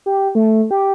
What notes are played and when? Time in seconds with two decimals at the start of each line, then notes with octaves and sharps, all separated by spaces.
0.06 G4
0.35 A3
0.71 G4